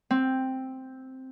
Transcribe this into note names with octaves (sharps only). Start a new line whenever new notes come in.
C4